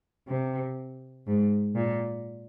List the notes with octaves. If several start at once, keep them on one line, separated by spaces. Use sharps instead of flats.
C3
G#2
A#2